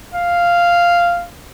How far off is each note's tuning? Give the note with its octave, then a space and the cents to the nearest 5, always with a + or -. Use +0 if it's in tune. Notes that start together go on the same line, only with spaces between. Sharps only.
F5 -5